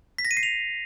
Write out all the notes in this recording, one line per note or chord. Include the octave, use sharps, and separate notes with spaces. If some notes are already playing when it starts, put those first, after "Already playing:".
B6
A#6
D#7
C7
F7